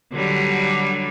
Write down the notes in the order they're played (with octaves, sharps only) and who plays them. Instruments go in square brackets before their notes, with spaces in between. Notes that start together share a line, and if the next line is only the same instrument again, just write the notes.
[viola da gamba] D3 F#3 G3